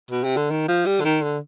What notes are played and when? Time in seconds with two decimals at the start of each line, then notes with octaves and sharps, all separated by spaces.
0.11 B2
0.24 C3
0.37 D3
0.51 D#3
0.68 F3
0.86 G3
1.01 D3
1.05 D#3
1.23 D3